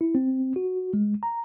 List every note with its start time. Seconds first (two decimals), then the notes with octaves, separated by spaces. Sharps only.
0.01 E4
0.15 C4
0.56 F#4
0.93 G#3
1.23 A#5